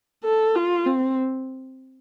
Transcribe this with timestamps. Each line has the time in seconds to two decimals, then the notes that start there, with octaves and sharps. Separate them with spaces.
0.24 A4
0.55 F4
0.86 C4